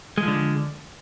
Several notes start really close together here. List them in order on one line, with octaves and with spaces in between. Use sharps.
G#3 F3 D3